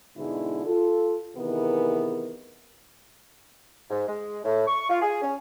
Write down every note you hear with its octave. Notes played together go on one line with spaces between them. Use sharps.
G#2 B2 D3 G#3 E4
F4 A4
C3 D#3 E3 B3 G#4 A#4
G#2
G#3
A2
C#6
F4
G#4
C#4